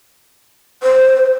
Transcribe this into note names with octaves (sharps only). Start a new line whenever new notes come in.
C5